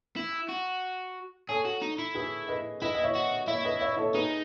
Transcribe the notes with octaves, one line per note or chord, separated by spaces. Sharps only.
E4
F#4
G#4 A4 C#5
F#4
D#4
E4
G#4 B4
B4 D#5
E4 B4 D#5
D#5
C#5 E5
F#4
E4 C#5 E5
B4 D#5
C#5 E5
A4 C#5
D#4 G#4 B4